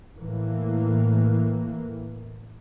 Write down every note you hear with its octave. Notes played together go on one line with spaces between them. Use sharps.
A2 E3 A#3